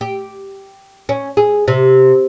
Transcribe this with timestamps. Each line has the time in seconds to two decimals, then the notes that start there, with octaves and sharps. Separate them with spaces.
0.01 G4
1.09 C#4
1.37 G#4
1.68 C3